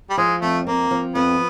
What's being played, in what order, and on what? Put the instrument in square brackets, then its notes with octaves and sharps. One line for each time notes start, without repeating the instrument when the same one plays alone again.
[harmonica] G3
[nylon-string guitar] F3 [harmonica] G#3
[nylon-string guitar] F2 [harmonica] A3
[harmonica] A#3 [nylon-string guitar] C4
[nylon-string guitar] F3
[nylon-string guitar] F2 [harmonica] B3